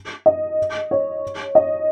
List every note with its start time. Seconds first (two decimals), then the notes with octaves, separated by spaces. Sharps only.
0.26 D#5
0.91 C#5
1.55 D#5